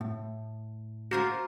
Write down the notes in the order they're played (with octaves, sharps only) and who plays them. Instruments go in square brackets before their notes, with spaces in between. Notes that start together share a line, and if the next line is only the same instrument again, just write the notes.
[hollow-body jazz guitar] A2
[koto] A#3 F4 A#4 [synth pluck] F#4 C5